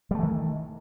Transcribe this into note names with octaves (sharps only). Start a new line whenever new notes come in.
D#3 E3 G3 A3